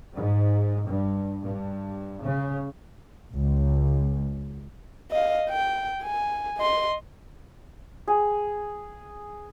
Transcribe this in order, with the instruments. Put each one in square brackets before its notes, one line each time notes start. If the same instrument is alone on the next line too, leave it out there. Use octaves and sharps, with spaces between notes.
[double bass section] G#2
G2
G2
C#3
C#2
[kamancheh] D#5 F5
G5
G#5
D#5 C6
[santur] G#4